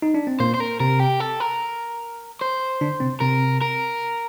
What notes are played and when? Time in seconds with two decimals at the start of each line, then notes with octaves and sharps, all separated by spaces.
0.02 D#4
0.14 D4
0.27 C4
0.40 A#2 A#3 C5
0.54 C5
0.60 A#4
0.80 C3 C4 A#4
1.00 G4
1.20 A4
1.40 A#4
2.41 C5
2.81 D3 D4
3.00 C3 C4
3.20 C3 C4 A#4
3.61 A#4